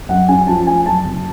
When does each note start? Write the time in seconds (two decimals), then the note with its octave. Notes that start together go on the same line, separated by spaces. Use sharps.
0.09 F#2 F#5
0.28 C#4 G#5
0.47 F3 A5
0.66 A3 G#5
0.86 F#2 A5
1.05 F#1